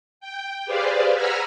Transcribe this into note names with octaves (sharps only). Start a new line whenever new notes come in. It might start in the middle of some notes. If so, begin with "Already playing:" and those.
G5
G4 G#4 B4 C5 D5 F5
F#5 G#5 A#5 B5 E6 F6